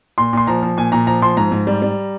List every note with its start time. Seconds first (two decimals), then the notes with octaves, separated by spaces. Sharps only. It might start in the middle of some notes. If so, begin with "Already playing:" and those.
0.18 A#2 C6
0.33 A#2 C6
0.47 F3 A#5
0.63 F3
0.77 A#2 G#5
0.92 A#2 A#5
1.07 F3 A#5
1.22 F3 C6
1.37 G#2 A#5
1.52 G#2
1.67 G3
1.82 G3